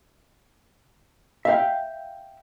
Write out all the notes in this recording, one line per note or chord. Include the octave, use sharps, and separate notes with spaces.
E5 F5 G5